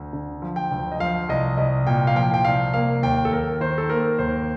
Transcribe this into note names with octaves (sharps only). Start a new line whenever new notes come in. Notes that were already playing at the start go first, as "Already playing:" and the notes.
Already playing: D2
D3
F3
G5
D2
D#5
F3 F5
C2 D#5
C2 D#5
A#2 G5
F5
F3 G5
G5
C2 F5
A#3 F5
D#2 G5
A4
D#2 A#4
D#3 C5
A4
A#3 A#4
D#2 C5